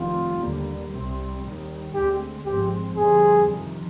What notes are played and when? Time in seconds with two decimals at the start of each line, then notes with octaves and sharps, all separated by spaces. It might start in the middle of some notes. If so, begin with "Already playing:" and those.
Already playing: F1 F2 D#3 G3 C4 F4
0.40 D#2 D3 G3 A#3
0.91 C2 C3 G3 C4
1.43 D#2 D#3 G3
1.94 D2 D3 G#3 C4 G4
2.46 G#1 G#2 F3 G#3 C4 G4
2.97 F2 D3 G3 C4 G#4
3.49 F2 C3 D#3